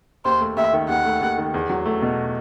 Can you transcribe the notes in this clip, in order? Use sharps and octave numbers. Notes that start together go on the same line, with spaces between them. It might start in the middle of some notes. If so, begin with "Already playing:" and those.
D#2 C5
A3
D#2 E5
D#3
D#2 F#5
A3
D#2
D#3
E2
F#3
A3
B2